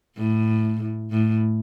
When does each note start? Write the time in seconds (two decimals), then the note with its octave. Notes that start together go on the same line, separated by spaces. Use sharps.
0.17 A2
1.11 A2